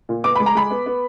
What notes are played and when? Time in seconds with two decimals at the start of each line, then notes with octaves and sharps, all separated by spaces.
0.09 A#2
0.24 B3 D6
0.35 G#3 B5
0.46 A#5
0.55 G#3 B5
0.71 B3
0.86 B3